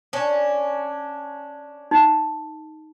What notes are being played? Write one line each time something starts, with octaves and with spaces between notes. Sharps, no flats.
C#4 D4
D#4